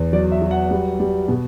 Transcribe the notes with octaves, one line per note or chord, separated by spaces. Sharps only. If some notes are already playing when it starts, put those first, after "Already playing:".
Already playing: E2
F#3 D5
E5
F#3
F#5
G3
G3
B2